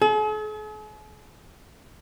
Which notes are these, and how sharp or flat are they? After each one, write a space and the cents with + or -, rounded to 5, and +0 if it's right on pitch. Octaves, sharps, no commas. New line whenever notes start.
G#4 +45